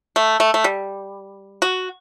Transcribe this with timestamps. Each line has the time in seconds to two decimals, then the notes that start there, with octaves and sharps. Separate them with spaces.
0.16 A3
0.40 A3
0.54 A3
0.64 G3
1.62 F#4